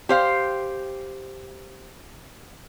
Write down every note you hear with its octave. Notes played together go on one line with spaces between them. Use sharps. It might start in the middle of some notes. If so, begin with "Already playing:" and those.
G4 C5 F5